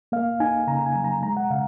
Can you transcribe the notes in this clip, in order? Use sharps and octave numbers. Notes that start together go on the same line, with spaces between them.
A#3 F5
D#4 G#5
C#3 A#5
G#5
F#3
A#5
G#3 A#5
F#5
C#3 F5